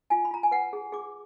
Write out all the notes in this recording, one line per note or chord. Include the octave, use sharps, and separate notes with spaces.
F4 G#5
B5
F4 A#5
G#5
B4 F#5
G#4
G#4 D6